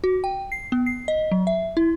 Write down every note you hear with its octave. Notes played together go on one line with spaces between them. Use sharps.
F#4
G5
C7
B3
C7
D#5
F#3
E5
E4